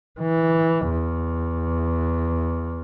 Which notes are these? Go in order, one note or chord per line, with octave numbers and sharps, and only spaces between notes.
E3
E2